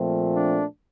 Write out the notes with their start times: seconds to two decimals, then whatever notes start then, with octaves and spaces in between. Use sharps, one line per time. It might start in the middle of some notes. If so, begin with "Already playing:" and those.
Already playing: A#2 F3 A3 C4
0.33 D4